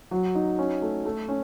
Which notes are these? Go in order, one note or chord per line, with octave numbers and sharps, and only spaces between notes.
F#3
D#4
C#4
A3
A3
C#4